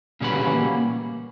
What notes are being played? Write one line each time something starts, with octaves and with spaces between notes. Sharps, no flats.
A#2 C#3 G3 C#4 F#4 B4
D3
C#3
E3
A#3